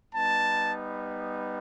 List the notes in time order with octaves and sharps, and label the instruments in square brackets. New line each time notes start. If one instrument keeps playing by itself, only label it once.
[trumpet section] G3 B3 D#4 A5